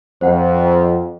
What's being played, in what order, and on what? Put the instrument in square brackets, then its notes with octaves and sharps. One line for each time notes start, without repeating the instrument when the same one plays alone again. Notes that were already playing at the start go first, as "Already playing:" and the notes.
[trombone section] F2 [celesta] C5 F#5 G5